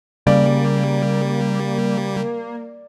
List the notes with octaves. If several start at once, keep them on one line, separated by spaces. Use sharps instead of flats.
C#3 G3 A#3 D5